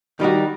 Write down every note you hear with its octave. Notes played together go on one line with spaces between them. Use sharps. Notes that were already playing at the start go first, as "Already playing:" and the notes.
D#3 G3 D#4 F#4